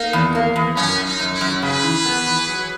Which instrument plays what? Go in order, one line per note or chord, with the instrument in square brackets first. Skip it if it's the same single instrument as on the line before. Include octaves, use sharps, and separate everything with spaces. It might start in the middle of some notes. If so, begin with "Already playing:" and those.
Already playing: [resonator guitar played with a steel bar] A#3 [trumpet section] D#4
[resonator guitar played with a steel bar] E2
A#3
E2
[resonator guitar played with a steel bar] F#2 [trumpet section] C#4
[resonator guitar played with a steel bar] F#2
[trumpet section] D#4
[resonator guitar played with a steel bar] F#2
[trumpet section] E4
[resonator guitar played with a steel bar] F#2
[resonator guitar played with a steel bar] C#3 [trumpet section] G#4 B4
[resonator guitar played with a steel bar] E3
B3
E3
F#3